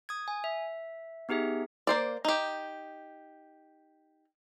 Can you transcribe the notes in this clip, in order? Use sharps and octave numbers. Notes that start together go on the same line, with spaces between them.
D#6 G#6
G#5
E5
B3 D#4 G4 G#4 E5
A#3 C5 D5
D#4 G4